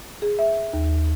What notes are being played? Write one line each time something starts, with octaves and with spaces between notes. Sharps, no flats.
G#4
E5
D#2